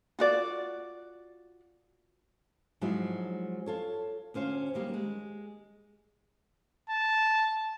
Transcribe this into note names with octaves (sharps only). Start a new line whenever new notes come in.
F4 F#4 D5
G#2 F3 F#3 G#3 D#4 E4
F4 A4 C#5
D2 C#4 C5 F5
F#2 D#3 G3 A#3 D#4
G#3
A5